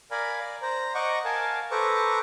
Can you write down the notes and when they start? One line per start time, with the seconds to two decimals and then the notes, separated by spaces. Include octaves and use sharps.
0.11 A#4 D5 F5 G#5 A#5 B5
0.39 D5
0.62 C5 A#5
0.95 D#5 F#5 A#5 C#6 D6
1.25 A#4 F5 G#5 A5
1.71 A4 B4 C5 A#5 C#6 D6